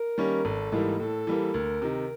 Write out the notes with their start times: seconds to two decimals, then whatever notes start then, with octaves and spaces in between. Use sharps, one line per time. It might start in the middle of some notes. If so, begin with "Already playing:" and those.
Already playing: A#4
0.18 D#3 G3 A#3 C#4
0.45 G#1 A4
0.72 G#2 E3 G3 A#3
1.00 A2 A4
1.27 E3 G3 A#3
1.54 D2 A#4
1.82 C3 D#3